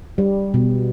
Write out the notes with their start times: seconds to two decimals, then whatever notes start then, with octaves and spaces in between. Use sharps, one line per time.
0.18 G3
0.54 B2